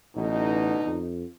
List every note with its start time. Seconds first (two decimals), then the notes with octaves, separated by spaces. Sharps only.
0.16 A1 B2 D3 D#4
0.86 F2